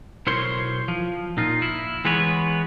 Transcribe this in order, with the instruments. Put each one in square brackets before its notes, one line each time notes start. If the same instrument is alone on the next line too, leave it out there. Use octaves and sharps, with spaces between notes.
[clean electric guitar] B1 E4 A#4 C5 C#5 C6
F3
A#2 D#4 F4
E4
E3 G#3 B3 B4 C#5